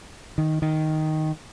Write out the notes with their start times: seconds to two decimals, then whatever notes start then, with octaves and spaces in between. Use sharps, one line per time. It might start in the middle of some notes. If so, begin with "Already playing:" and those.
0.38 D#3
0.62 D#3